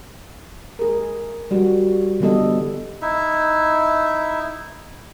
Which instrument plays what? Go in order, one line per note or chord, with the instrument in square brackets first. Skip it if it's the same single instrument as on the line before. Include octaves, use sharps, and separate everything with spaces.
[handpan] G#4 A#4
G3 F#4
D3 E3 G3 B3 A4 D#5
[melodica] D#4 E4 E5